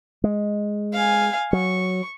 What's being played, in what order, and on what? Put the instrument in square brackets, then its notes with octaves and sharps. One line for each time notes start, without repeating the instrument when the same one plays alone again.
[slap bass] G#3
[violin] F5 G#5
[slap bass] F#3 [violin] C#6